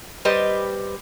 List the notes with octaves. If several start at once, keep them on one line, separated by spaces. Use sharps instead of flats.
G3 G4 B4 C5 D#5